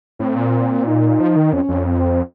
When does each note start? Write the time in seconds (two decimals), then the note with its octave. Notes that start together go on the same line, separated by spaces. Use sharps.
0.19 A2 C4
0.36 A#2
0.86 D#4
1.20 F3
1.36 D#3
1.53 F2 C#4
1.69 F2
1.86 C4